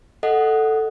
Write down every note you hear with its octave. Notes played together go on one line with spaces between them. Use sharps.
A4 D#5 F#5